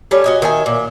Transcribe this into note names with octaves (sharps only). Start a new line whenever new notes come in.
G3 A3 C#4
F#4 D#5 G#5
D#3 E5 G#5
A#2